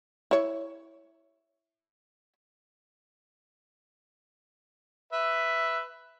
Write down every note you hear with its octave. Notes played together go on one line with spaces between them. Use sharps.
E4 C#5
B4 E5